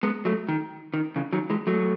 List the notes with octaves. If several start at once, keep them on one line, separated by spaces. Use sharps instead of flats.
G#3 B3
F#3 A3
D#3
D#3
C#3 E3
D#3 F#3
E3 G#3
F#3 A3